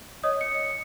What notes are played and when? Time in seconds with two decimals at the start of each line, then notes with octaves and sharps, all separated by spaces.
0.23 C#5 D#5 D#6
0.41 C#7